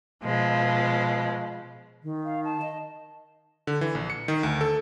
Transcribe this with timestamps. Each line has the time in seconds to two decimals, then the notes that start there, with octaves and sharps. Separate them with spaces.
0.23 B2 F3 G#3
2.04 D#3
2.25 F5
2.45 A5
2.62 D#5
3.67 D3
3.81 E3
3.95 A#1
4.10 C#7
4.28 D#3
4.43 D2
4.61 A4